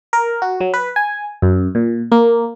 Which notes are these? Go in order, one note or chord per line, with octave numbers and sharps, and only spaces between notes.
A#4
F#4
F#3
B4
G#5
F#2
A#2
A#3